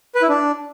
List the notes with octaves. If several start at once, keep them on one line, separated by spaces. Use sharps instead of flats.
B4
E4
D4